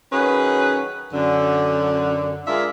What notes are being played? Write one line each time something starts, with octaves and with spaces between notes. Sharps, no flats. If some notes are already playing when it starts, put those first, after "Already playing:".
D#3 F#3 C#4 G#4 B4
F#2 D3
G#3 D4 F4 G#4 A#4 E5